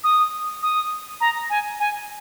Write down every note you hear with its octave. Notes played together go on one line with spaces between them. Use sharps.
D#6
D#6
A#5
G#5
G#5